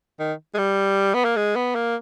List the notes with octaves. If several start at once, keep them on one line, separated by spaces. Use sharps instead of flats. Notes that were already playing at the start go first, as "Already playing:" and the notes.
D#3
G#3
G3
B3
A#3
G#3
B3
A#3